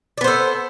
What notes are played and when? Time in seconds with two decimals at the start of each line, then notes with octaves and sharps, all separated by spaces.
0.18 D5
0.21 B3
0.24 C5
0.28 A4